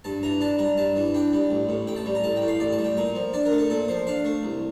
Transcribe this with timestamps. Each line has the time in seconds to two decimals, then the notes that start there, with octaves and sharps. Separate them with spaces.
0.04 G2 A5
0.23 E3 A#5
0.41 D4 A5
0.59 G3 A#5
0.77 G2 A5
0.96 E3
1.14 D4 G5
1.33 G3
1.51 A1
1.69 A2
1.87 A1 G5
1.96 A5
2.06 G3
2.15 A#5
2.24 A1 A5
2.36 G5
2.42 A2
2.48 F5
2.60 A1 D5
2.73 A5
2.79 G3
2.84 G5
2.97 A#2 A#5
3.15 F3
3.33 D4 D5
3.46 A#4
3.52 A3
3.58 A4
3.70 A#2 A4
3.88 F3 C5
4.07 D4 F5
4.25 A3
4.43 C2